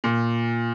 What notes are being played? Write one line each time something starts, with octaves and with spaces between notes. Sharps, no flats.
A#2